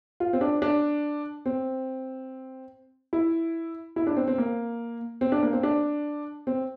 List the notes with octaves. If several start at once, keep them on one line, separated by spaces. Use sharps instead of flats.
F4
C4
D4
D4
C4
E4
E4
D4
C4
C4
A#3
C4
D4
A#3
C4
D4
C4